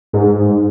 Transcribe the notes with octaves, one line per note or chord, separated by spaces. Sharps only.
G#2